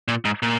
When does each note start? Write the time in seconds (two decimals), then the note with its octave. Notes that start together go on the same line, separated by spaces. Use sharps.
0.08 A#2
0.25 G#2
0.43 A#2